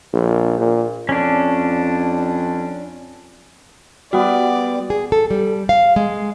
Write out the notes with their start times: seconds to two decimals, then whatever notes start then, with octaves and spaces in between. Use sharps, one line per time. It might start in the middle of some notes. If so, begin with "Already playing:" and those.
0.13 A#1
0.59 A#2
1.09 F2 C#4 D4
4.13 G3 B3 F#4 D5
4.90 G#4
5.12 A4
5.31 G3
5.69 F5
5.96 G#3